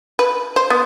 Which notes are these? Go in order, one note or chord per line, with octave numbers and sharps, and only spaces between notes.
B4
C5
B3